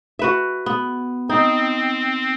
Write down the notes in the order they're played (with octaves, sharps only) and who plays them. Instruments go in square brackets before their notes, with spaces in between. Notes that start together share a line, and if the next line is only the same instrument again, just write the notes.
[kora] F#4 B4 E5
B3
[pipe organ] C4 [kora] D#4